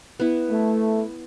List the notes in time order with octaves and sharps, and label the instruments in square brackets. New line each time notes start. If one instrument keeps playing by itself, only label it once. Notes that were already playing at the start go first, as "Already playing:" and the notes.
[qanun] B3 E4
[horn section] A3